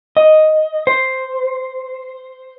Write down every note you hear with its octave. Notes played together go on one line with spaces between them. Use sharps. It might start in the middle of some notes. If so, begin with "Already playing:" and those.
D#5
C5